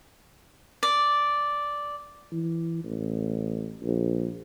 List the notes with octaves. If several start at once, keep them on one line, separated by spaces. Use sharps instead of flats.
D5
E3
A1
A#1